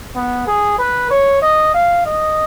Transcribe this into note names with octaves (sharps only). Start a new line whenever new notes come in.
B3
G#4
B4
C#5
D#5
F5
D#5